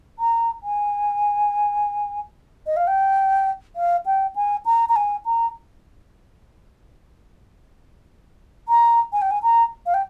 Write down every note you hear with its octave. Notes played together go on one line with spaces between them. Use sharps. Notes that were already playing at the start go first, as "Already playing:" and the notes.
A#5
G#5
D#5
F5
G5
F5
G5
G#5
A#5
A#5
G#5
A#5
A#5
G#5
G5
G#5
A#5
F5
G5